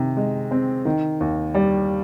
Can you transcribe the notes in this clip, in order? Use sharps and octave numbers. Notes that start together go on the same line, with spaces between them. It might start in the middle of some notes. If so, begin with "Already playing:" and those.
Already playing: C3 D#3
G#3
C4
D#3
D#2
G3